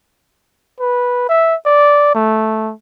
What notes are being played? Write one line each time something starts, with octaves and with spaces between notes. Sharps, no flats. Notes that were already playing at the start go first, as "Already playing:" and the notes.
B4
E5
D5
A3